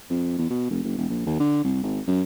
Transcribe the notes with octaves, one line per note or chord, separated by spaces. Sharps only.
F2
E2
B2
F1
F#1
E1
A#1
D#2
D3
C2
G#1
F#2